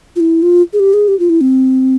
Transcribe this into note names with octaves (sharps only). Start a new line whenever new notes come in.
F4
E4
F4
G#4
G4
G#4
G4
F4
E4
C4